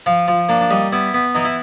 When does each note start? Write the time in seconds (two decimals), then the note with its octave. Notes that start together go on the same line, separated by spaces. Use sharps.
0.06 F3 F4
0.28 F3
0.49 A#3 D4
0.61 D4
0.70 G3 D#4
0.92 B3 E4
1.14 B3
1.35 E3 D#4
1.45 E4